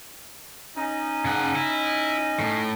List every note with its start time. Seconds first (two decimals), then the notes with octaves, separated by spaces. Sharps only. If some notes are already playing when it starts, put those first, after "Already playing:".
0.75 C#4 D#4
1.25 C#3 F#5
1.56 E4
2.39 A2